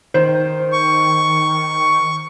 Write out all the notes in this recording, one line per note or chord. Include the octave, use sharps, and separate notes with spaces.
D#3 C5
C#6